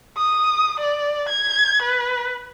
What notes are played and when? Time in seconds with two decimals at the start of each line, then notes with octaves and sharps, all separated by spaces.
0.18 D#6
0.79 D5
1.29 G#6
1.82 B4